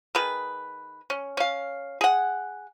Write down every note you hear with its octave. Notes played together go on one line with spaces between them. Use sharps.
D#3 G#4 B4
C#4
C#4 F5
G#4 F#5